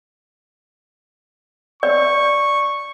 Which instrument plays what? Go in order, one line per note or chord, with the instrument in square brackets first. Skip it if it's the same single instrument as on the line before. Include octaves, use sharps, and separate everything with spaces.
[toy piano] D5 [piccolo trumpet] C#6